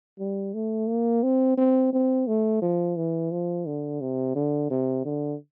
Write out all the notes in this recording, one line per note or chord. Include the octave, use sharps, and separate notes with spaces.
G3
A3
A#3
C4
C4
C4
A3
F3
E3
F3
D3
C3
D3
C3
D3